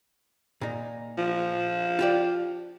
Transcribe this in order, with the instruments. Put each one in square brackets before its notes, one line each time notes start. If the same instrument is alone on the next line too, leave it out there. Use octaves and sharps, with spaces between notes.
[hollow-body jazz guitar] A#2 D#4
[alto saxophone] F3
[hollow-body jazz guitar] F4 G4 D5